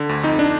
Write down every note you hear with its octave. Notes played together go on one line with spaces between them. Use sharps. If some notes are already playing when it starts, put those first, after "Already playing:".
Already playing: D3
D2
F2 D#4
D4